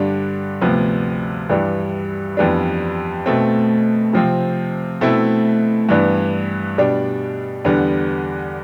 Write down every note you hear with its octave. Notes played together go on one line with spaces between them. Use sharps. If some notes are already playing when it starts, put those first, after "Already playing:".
Already playing: G2 D3 G3 D4
D2 C3 F3 B3
G2 E3 G3 D4
F2 E3 G3 B3 D4
B2 A3 C4
C3 F3 C4
B2 A3 C4 E4
G2 E3 B3 D4
B2 G3 D4
E2 D3 G3 B3 D4